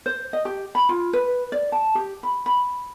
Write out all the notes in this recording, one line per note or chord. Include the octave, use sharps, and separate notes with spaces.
C5
D#5
G4
B5
F4
B4
D5
A5
G4
B5
B5